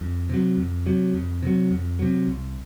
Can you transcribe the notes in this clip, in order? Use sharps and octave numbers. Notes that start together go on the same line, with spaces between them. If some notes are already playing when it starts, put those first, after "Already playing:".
F2
C3 F#3
F2
C3 F#3
F2
C3 F#3
F2
C3 F#3
C2